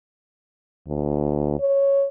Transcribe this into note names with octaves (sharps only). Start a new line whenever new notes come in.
D2
C#5